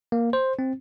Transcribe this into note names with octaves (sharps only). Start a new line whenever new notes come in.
A#3
C5
C4